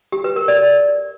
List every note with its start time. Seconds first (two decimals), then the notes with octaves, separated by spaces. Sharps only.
0.12 G4
0.24 B4
0.36 A#4
0.48 D5